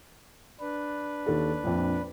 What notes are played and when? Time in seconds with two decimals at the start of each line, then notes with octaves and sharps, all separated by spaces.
0.60 D4 B4
1.26 D#2 A4
1.64 A#1 F2